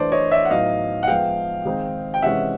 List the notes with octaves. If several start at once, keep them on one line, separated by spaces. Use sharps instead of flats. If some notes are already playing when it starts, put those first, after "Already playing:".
Already playing: E3 A3 D4 C5 D5
C#5 D#5
D5 E5
F#5
A2 F#3 B3 D#4 D#5 F5
F#5
F3 G#3 B3 F5 G5
D#3 G#3 C4 D#4
G5
C3 E3 G#3 C#4 E5 F#5